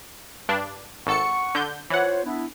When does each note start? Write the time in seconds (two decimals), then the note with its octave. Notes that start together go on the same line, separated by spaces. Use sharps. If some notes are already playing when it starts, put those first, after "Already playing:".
0.49 G2 D4
1.06 G#1 A4 F#5 C#6 C#7
1.55 D3 G6
1.90 E3 F4 C5 C#5 F#5
2.25 B3 D4 E4